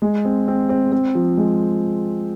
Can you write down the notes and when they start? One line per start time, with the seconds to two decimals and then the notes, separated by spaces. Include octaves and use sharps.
0.02 G#3
0.25 C4
0.48 C4
0.69 C4
0.92 C4
1.15 F3
1.37 G#3